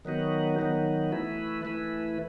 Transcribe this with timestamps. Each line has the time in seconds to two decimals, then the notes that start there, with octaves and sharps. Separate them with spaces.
0.05 D#3 F#3 B3 D#4 F#4
0.59 D#3 F#3 B3 D#4 F#4
1.12 E3 A3 E4 B4
1.65 E3 A3 E4 B4